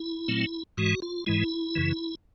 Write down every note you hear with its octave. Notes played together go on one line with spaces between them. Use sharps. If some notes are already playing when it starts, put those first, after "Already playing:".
Already playing: E4
A#2 F#3 A3 C4
G#2 E3 G#3 F#4
F4
G#2 E3 G#3 E4
F#2 C#3 E3